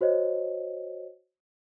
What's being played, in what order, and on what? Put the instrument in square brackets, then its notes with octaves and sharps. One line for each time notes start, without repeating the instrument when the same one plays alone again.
[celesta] F#4 C5 C#5 D#5